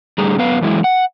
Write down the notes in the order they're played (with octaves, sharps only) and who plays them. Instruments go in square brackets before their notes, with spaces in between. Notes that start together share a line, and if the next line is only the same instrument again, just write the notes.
[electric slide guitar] A2 D3 G3 G#4 A#5
F#2 B3 B4 F5
F#2 E3 G#3 E4
F#5